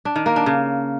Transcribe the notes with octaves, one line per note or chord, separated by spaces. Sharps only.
D4
D#3
A#3
D4
C#3